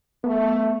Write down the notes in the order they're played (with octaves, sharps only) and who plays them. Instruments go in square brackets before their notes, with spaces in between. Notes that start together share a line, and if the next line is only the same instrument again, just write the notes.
[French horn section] A3 [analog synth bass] B3